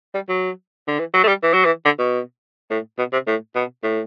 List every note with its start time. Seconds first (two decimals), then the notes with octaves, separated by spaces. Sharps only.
0.14 G3
0.29 F#3
0.88 D3
0.99 E3
1.14 F#3
1.24 A3
1.28 G3
1.42 E3
1.53 F#3
1.65 E3
1.85 D3
1.99 B2
2.70 A2
2.98 B2
3.13 C3
3.27 A2
3.55 B2
3.83 A2